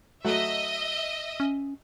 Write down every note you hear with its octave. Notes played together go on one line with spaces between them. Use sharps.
F#3 A3 F#4 D#5 E5
C#4